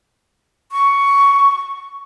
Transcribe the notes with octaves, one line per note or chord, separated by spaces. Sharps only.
C#6